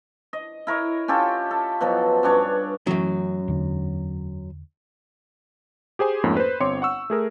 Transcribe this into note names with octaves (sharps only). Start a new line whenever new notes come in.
D#5
E4 A#4 C#5 D#5
C#4 F4 G4 A4
A4
B2 F3 F#3
G2 C#4 D4 C#5
F#2 E3 F#3 A3 C#4
E2 D3
G4 G#4 C5 G#5
F2 G#2 A3 A#3 C#4
B4 C5
G1 C4 C#5 C6 D6 C#7
F#5 C#6 E6
A3 G#4 A#4